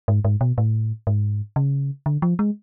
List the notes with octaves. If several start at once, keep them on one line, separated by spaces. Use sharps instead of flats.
G#2
G#2
B2
A2
G#2
C#3
D3
F3
G#3